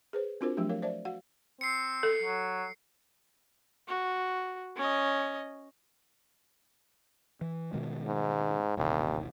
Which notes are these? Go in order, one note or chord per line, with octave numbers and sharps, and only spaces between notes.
G#4 B4 C5
C4 D4 F4 F#4 A#4 C5
F3 F#3 A3 D4 G4
A#4 C#5 F5
C5 D5 E5 A5
F#4 F5 F#5
C4 C7 C#7
A4
F#3
F#4
C#4 D#5
E3
B2 D#3 G#3
G#2
D#1 A1 D#2 C3